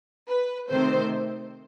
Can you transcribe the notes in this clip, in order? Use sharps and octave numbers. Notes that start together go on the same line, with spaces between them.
B4
C3 D#3 A3 C4 C5